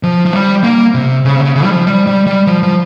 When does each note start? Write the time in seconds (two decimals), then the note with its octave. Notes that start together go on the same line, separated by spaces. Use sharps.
0.03 F3
0.25 F3
0.33 G3
0.64 A#3
0.94 C3
1.25 C#3
1.36 C3
1.40 C#3
1.56 C#3
1.64 G3
1.71 F3
1.87 G3
2.07 G3
2.26 G3
2.47 F3
2.63 F3